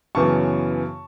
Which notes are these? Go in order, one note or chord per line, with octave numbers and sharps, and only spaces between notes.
F#2 C#3 E3 B3 A5 C#6